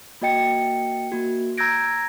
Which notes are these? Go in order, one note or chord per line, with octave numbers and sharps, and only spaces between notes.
A#3 F#4 D#5 G5 C#7
A#3 F#4
A#5 E6 G6 G#6 A#6 D7